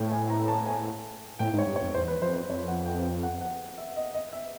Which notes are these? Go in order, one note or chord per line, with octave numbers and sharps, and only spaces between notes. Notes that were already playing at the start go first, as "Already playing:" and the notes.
Already playing: A2 G5
G#5
A#5
A5
G#5
A2 G5
G#2
C#5
G2
C#5
F2
E2 C5
B4
F2 C5
C5
F2 C#5
F#5
G5
G5
F#5
F#5
E5
D#5
D#5
E5